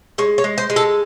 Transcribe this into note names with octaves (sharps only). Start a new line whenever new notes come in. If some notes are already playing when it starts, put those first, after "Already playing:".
G#3 C#5
C#5
G#3
C5
G#3
A4